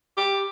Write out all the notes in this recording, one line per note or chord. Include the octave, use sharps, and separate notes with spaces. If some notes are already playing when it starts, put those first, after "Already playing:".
G4